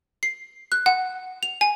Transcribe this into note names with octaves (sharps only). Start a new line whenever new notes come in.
C7
F#6
F#5
F7
G#5